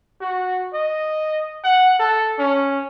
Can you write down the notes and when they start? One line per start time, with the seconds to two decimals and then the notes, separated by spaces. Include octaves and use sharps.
0.21 F#4
0.74 D#5
1.64 F#5
1.99 A4
2.39 C#4